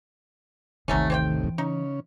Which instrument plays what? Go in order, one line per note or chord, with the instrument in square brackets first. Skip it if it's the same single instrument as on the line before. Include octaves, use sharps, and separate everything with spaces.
[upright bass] A1 D#3 [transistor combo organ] D#2 A2 C3 [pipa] F#3 A3 C#4
[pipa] C4 C#5 G5
[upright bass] E3
[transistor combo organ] C#3 C#4 [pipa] D#4